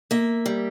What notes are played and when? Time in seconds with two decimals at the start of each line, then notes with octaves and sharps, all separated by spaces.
0.11 A#3 E5
0.46 G3